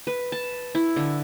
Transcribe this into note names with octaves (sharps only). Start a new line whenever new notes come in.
B4
A5
E4
D3